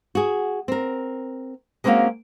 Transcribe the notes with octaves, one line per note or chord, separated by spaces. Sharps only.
F#4 G#4
C4 A#4
G#3 A#3 C4 C#4 F#4 F5